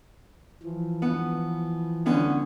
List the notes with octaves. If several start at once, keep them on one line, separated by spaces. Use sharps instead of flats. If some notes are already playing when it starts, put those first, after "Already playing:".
E3 F3
B3
D3 B3 C#4